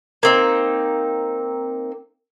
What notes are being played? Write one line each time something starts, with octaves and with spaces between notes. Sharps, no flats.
A#3 C4 D#4